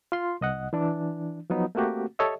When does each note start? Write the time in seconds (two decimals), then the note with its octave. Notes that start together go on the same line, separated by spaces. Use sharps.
0.12 F4 C6
0.41 C2 D#5 F#5
0.73 E3 D4
1.50 F3 F#3 B3 D#4
1.75 A3 A#3 C4 F#4 G4
2.19 G4 A4 C#5 D#5 E5